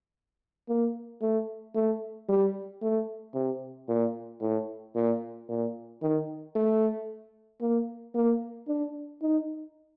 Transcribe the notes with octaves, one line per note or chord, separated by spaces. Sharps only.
A#3
A3
A3
G3
A3
C3
A#2
A2
A#2
A#2
D#3
A3
A#3
A#3
D4
D#4